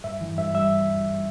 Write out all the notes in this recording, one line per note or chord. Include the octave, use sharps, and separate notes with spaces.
G2 E5
E3
G2 E5
G3 E5